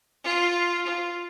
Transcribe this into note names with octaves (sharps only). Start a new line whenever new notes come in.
F4
F4